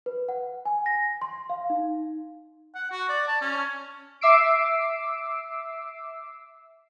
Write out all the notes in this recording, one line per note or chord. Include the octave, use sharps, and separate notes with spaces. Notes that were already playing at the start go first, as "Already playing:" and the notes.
B4
F#5
G#5
A#6
C6
F5
D#4
F#5
F#4
D5
A5
C#4
E5 D6 E6 C7 D7